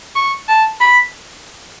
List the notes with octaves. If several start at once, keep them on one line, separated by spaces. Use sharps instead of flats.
C#6
A5
B5